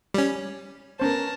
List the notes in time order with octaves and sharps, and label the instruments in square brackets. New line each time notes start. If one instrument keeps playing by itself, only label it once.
[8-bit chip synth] G3 C#4
[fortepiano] B3 C#4 C5 [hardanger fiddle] A#4 A5